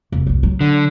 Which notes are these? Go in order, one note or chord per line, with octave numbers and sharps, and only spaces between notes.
F1
C2 F#2
F#3
D3